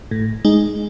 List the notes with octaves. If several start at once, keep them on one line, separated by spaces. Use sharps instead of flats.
A2
G#3 D#4